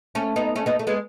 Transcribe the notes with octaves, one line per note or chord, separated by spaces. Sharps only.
A3 C#4
B3 D#4
A3 C#4
B3 D#4
A3
G#3 B3